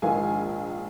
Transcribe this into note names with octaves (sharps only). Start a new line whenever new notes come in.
A#1 G#2 D#3 G#3 F5 G#5